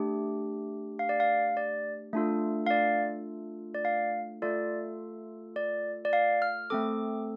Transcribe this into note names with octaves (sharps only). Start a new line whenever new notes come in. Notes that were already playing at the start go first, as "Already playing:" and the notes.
Already playing: A3 D4 G4
F5
D5
F5
D5
A3 D4 F4 A4
F5
D5
D5
F5
A3 F4 A4 D5
D5
D5
F5
F6
A3 C4 A4 D6